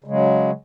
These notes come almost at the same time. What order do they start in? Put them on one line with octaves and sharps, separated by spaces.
C#3 G#3 F#3